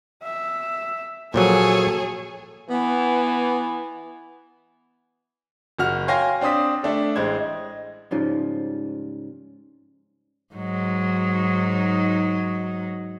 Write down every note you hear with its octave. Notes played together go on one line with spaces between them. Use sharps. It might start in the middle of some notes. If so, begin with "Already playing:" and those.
E5
A#2 F3 F#3 G#4 A4 C#5
E3 B3
F#1 F#4 F6 F7
C#5 F5 G5 G#5 C6 A#6
C4 D4 C6 D#6 B6
A3 D4 A4
A1 G#3 C5 G#6
D#5
G#2 C#3 F3 G3
G#2 F#3 D#4